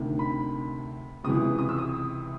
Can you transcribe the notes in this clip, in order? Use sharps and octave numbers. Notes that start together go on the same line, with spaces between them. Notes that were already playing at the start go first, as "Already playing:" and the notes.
Already playing: D2 C3 D#3
B5
C#2 C3 E3 D#6
D#6
E6
D#6